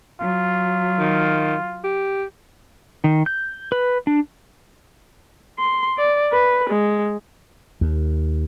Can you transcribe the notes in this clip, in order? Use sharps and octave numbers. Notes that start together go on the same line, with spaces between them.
F#3 F4
D#3
G4
D#3
G6
B4
D4
C6
D5
B4
G#3
D#2